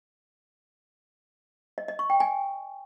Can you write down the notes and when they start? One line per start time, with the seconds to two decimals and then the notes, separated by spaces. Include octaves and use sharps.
1.78 D#5
1.88 D#5
1.99 C#6
2.10 G5
2.20 G#5